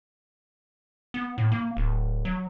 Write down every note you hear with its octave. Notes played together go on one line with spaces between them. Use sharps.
B3
A2
A#3
D1
F#3